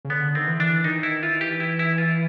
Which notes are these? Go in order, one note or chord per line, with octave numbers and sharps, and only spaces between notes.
C#3
D3 B3
D#3 C4
E3
D4
D#3 D#4
E4
E3 F4
G4
E4
E4
F4